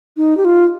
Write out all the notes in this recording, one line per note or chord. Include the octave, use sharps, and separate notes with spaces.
D#4
G4
F4